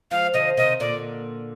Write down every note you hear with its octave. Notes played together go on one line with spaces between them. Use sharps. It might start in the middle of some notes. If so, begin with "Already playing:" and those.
F3 G#3 F5
D3 F3 D#5
C3 D#3 D#5
A#2 D3 D5